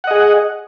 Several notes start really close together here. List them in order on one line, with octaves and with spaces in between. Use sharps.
F#5 D#5 G#4